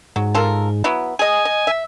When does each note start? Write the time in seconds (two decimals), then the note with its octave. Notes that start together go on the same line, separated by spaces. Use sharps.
0.16 G#2 F#3
0.35 F4 A4 A#4
0.84 F#3 B3 E4
1.19 G#4 D#5 G#5
1.45 D#5
1.67 E5